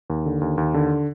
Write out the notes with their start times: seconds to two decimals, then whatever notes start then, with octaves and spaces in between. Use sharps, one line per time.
0.10 D#2
0.26 D3
0.41 D#2
0.58 D#2
0.74 D3